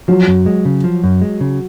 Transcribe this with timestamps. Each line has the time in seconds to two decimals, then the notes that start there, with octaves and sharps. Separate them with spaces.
0.08 F3 F#3
0.28 F#2
0.46 G#3
0.65 C#3
0.84 F3
1.04 F#2
1.22 G#3
1.41 C#3